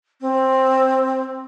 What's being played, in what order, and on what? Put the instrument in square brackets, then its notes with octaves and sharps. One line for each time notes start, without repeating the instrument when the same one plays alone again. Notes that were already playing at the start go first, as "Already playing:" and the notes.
[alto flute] C4